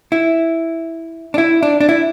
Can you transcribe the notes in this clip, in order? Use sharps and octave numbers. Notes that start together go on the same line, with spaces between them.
E4
D4
E4
D4
D4
E4